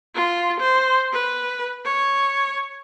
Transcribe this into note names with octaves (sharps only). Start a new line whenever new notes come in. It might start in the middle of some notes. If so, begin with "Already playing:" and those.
F4
C5
B4
C#5